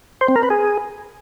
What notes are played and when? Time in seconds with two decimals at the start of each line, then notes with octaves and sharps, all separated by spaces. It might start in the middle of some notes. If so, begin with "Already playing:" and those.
0.21 C5
0.28 C4
0.36 A#4
0.43 B4
0.50 G#4